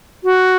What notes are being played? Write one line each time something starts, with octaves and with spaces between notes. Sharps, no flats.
F#4